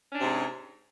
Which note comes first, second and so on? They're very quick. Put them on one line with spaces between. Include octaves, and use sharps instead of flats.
C#4 D4 C3 G#2